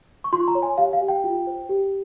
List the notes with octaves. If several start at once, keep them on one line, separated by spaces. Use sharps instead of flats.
C#6
F4 C6
A#5
C#5
G#5
G4 F5
F5
G4
G5
F4
C5
G4